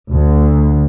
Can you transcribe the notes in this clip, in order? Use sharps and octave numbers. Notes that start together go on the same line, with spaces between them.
D2